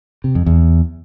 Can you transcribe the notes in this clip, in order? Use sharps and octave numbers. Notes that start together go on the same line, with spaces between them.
C3
F2
E2